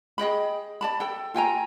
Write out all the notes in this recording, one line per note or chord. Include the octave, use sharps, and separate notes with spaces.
G#4 D#5 G5 B5
D5 A5 B5
A4 G5
F4 G5 G#5 A#5